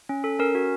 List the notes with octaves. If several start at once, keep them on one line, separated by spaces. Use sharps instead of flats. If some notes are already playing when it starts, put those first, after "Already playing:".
C#4
A4
C#4 A#4
F#4